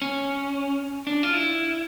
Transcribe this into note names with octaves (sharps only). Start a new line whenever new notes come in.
C#4
D4
F4
E4